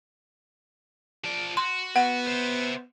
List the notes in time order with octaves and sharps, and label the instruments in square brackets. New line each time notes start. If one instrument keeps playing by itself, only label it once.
[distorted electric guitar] F3 D5
[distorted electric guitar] F#4 [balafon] C6
[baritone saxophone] B3 [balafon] F#5
[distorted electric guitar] C5 E5